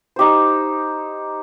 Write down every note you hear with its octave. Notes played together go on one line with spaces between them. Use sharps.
D#4 G4 C5